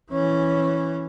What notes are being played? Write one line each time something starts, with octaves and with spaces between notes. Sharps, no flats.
E3 C#4